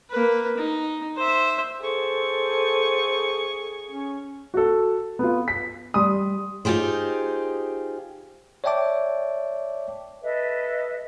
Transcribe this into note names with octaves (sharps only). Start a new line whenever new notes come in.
A#3 B4
D#4
C5 E5
G#4 A4 C5 C#6
C#4
F#4 A4
B3 F4
B6
G3 C6 D#6
D#4 F4 G4 G#4 C5
C#5 D5 E5 G5 A5 D6
A4 B4 D#5 E5